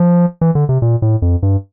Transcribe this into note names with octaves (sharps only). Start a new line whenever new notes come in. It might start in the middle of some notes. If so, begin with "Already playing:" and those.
Already playing: F3
E3
D3
C3
A#2
A2
F2
G2